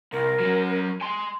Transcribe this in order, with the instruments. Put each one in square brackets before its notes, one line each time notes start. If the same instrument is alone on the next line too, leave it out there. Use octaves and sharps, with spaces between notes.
[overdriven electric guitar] C2 [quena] A#4
[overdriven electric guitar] F#3 C#4
G#5 C6